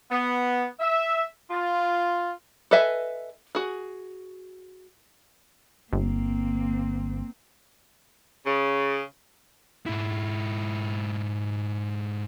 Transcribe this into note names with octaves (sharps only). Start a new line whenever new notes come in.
B3
E5
F4
A4 B4 D#5 E5 G#5
F#4 G#4
G1 A#3 C4
C#3
G#2 E4